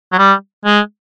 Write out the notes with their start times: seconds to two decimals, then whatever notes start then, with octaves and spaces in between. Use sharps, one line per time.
0.12 F#3
0.18 G3
0.66 G#3